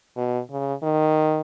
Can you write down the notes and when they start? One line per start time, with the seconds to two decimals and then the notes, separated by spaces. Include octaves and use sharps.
0.17 B2
0.51 C#3
0.83 D#3